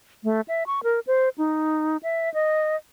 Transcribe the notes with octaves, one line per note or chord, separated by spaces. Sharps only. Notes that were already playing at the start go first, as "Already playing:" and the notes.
A3
E5
C#6
A#4
C5
D#4
E5
D#5